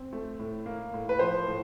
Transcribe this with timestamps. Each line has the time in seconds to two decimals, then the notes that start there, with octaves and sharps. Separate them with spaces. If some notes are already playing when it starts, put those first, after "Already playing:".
Already playing: C4
0.13 A3
0.39 A2
0.66 A#3
0.93 A2
1.09 B4
1.19 F3 C5
1.46 A2